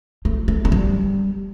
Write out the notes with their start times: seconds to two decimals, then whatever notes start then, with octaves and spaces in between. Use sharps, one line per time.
0.25 A3
0.48 A3
0.65 A3
0.72 G3